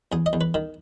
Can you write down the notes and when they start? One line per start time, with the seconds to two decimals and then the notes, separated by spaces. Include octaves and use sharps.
0.12 E2 G#4
0.26 D#5
0.33 E2
0.41 B4
0.54 D#3